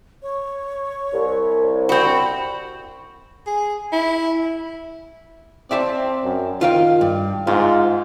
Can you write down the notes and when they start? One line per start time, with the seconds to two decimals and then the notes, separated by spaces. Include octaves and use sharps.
0.22 C#5
1.14 C2
1.89 C4 F#4 B5
3.47 G#4
3.93 E4
5.71 C4 D5 E5 A5
6.24 F#2
6.61 D#3 F4 F5 G5
7.01 G2
7.47 G#2 F4